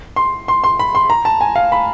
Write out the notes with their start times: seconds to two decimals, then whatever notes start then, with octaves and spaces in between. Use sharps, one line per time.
0.16 C6
0.48 C6
0.64 C6
0.79 B5
0.95 C6
1.10 A#5
1.25 A5
1.41 G#5
1.56 F5
1.72 B5